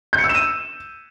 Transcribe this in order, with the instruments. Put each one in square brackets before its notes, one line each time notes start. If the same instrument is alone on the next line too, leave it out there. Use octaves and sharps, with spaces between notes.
[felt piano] G6
C#7
E6
E7
D#7